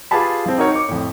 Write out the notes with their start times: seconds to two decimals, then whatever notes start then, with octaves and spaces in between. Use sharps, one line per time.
0.11 F4 G4 G#4 B4 A5 B5
0.46 F3 C4
0.58 D#4 F#4 A#4 C#5
0.72 D6 C#7
0.89 F2 A2